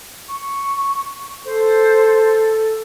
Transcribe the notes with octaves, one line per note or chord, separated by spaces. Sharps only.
C#6
A4 C5